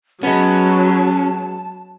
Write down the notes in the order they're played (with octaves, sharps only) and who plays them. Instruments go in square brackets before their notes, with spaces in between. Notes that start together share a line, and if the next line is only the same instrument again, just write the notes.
[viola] F#3 [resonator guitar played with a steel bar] G#3 B3 [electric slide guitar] C#4 [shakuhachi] A5